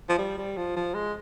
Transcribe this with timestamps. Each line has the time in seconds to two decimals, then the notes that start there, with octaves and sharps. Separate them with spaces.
0.09 F3
0.18 G3
0.38 G3
0.57 F3
0.76 F3
0.94 G#3